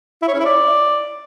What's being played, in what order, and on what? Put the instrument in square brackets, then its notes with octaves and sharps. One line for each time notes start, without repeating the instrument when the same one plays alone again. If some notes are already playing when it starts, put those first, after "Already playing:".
[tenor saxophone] E4
C#5
C#4
E4
D5